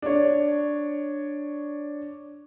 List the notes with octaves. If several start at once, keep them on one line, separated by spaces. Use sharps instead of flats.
D4 C#5